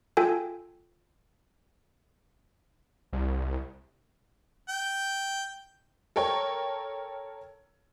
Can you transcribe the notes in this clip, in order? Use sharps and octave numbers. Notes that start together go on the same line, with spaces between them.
F4 A4 G5 G#5
C2
G5
A4 A#4 C#5 G5